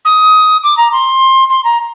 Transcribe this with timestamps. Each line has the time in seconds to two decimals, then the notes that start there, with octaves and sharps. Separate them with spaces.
0.05 D#6
0.63 D6
0.77 A#5
0.92 C6
1.49 C6
1.64 A#5